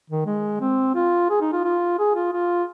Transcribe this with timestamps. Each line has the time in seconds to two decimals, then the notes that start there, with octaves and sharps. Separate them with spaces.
0.10 D#3
0.26 G#3
0.61 C4
0.95 F4
1.30 G#4
1.41 D#4
1.52 F4
1.64 F4
1.99 G#4
2.15 F4
2.33 F4